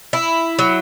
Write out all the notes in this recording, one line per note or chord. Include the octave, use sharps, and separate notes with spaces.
E4
F#3